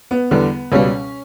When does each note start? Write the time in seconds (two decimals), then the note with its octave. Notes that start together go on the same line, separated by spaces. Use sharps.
0.11 B3
0.31 E2 D3 G3
0.72 C#2 B2 G3 C#4